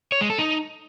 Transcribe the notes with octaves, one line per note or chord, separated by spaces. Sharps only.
C#5
G#3
A4
D#4